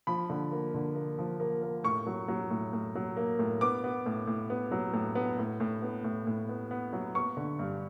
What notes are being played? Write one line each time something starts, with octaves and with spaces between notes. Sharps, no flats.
F3 B5
D3
A#3
D3
A#3
F3
A#3
A#3
A2 C#6
F#3
F#3
A2
A2
F#3
A#3
A2
B3 D6
B3
A2
A2
B3
F#3
A2
B3
A2
A2
B3
A2
A2
B3
B3
F#3
B3 C#6
D3
G2